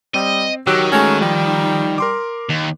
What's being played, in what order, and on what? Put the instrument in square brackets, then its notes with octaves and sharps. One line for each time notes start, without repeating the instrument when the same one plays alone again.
[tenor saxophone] G3 [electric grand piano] C4 [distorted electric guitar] D#5
[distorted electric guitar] D#3 [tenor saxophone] F#3 [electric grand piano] G4 E6 F#6
[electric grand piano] G#3 A3 F#4 [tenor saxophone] C#4
[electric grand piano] F3 [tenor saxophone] G3
[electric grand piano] A#4 C6 D6
[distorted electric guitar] D#2